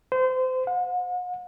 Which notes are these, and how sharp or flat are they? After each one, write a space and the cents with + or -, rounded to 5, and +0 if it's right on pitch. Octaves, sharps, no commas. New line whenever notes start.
C5 -30
F#5 -40